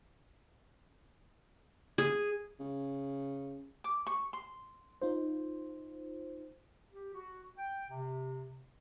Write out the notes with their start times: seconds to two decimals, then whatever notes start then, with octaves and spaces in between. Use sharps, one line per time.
1.98 G#4
2.60 C#3
3.84 D6
4.07 C#6
4.33 C6
5.02 D#4 F4 C5
6.92 G4
7.14 F#4
7.57 G5
7.90 C3